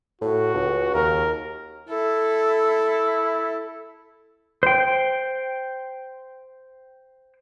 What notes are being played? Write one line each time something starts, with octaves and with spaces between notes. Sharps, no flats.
A2 F#4
C#2
D#2 A#4
E4 A4
C5 G5